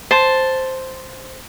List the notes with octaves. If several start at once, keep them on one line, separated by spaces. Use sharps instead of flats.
C5 A5